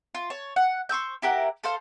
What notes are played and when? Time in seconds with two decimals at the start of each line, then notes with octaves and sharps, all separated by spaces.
0.15 F4
0.30 C#5 A5
0.56 F#5
0.89 C5 C#6 E6 G6
1.22 E4 G4 A#4 F#5
1.63 A4 C5 F5